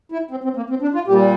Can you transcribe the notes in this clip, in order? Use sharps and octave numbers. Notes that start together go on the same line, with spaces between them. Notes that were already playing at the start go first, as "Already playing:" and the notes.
E4
C4
C4
A#3
C4
D4
F4
A#2 G3 G4